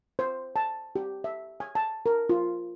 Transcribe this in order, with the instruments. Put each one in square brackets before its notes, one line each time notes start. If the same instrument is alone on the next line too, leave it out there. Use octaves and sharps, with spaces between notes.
[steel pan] C5
A5
G4
E5
G#5
A5
A#4
F4